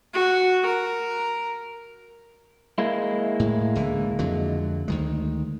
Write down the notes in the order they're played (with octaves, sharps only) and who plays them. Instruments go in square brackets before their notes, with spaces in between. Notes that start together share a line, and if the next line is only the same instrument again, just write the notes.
[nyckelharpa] F#4
A#4
[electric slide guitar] G#3 A#3 E4
[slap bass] A2
C#2 D3 E3
F2 D3 F#3
D2 D#3 G#3